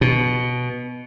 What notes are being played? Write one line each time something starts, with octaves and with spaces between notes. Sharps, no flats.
B2